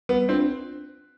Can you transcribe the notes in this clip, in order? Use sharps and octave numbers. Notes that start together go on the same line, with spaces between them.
G3 B3
C4 D4 F4